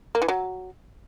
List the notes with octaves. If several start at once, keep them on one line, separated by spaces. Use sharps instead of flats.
A#3
E3
F#3